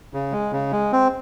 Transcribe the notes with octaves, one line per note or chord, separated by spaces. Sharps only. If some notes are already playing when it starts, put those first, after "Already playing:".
C#3
G#3
C#3
G#3
C4